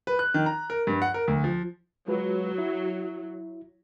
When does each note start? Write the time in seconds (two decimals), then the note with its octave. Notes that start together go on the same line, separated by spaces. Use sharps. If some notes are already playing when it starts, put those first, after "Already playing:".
0.07 B4
0.19 F#6
0.34 D#3
0.46 A#5
0.70 A#4
0.87 G2
1.02 F#5
1.14 A#4
1.28 D2
1.44 F3
2.08 F#3 G#3 F4 B4
2.58 E4